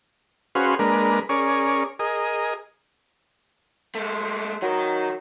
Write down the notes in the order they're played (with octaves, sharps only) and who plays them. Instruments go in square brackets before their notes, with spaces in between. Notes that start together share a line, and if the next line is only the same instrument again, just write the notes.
[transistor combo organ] C#4 F#4 G#4 B4 C5 F5
G#3 A#3 D4 A#4 B4
C#4 G#4 A#4 C#5 D5
G#4 A#4 D#5
[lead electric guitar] G#3 A3
[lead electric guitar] D#3 A#4 [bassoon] F#3